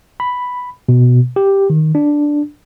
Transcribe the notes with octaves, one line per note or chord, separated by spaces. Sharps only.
B5
B2
G4
D#3
D4